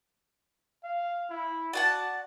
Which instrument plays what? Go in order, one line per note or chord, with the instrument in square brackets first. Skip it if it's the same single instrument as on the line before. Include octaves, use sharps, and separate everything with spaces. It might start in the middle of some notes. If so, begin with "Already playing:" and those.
[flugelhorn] F5
E4
[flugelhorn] F#4 [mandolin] D5 F#5 A5